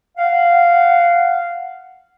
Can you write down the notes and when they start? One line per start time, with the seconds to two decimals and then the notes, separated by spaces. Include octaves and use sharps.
0.17 F5 F#5